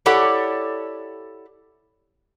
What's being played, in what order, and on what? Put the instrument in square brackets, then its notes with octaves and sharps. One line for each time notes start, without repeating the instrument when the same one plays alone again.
[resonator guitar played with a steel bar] E4 G4 A4 C#5 D5 F#5